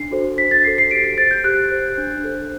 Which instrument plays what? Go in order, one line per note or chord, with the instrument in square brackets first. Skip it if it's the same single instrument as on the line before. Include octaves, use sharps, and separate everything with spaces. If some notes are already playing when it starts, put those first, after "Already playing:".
Already playing: [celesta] D4 C7
F#4 A4 C5
D4 B6
A6
F#4 A4 C5 C7
C7
G4 D7
C7
C5 A6
G6
G4 F#6
C5
D4
A4 C5